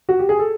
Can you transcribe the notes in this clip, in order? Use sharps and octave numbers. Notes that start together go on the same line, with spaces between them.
F#4
G4
G#4
A4